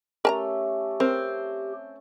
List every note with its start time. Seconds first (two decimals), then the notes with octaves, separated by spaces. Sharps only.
0.25 A3 C#4 G4 A4 A#4 A5 A#5
1.00 C4 A#4